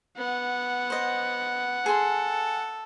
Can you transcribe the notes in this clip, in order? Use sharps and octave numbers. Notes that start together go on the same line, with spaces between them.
B3 F#5
C5 D#5
G#4 A4 C6